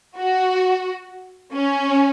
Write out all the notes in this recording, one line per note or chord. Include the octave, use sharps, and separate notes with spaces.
F#4
C#4